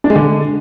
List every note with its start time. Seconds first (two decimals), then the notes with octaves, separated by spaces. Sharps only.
0.04 D4
0.10 G#3
0.16 D3